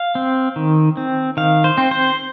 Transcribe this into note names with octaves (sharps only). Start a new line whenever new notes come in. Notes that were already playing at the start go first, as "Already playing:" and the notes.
Already playing: F5
C4
D#3
C4
D#3 F5
C5
C4
C5